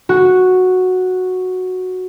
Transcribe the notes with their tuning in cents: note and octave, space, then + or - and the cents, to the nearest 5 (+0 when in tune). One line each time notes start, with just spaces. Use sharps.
F#4 -5